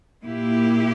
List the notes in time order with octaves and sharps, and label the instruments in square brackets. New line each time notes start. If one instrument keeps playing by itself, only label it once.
[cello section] A#2 A#3 E4 G4